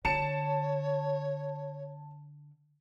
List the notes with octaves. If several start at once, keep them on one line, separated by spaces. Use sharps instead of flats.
D3 C#5 A5 C#7 E7